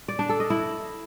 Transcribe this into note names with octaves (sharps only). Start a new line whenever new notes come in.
D5
D4
A4
D#5
E4